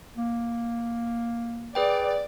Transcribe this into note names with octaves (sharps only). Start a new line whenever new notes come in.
A#3
G#4 B4 D5 G5